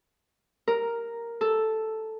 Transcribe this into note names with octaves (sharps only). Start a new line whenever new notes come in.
A#4
A4